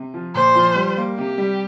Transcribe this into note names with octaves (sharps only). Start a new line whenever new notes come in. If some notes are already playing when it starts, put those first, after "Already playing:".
Already playing: C3
F3
A#2 C5
F3
G3
A#3
C3 G4
G3